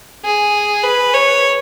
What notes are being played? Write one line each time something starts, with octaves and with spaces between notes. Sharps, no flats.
G#4
B4
C#5